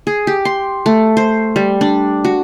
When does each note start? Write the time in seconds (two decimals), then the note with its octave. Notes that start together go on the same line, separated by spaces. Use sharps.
0.07 G#4
0.27 G4
0.45 C6
0.86 A3
1.17 C5
1.56 G3
1.81 D4
2.25 F#4